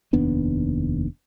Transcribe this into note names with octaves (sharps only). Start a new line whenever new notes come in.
F1 D#2 B3 D4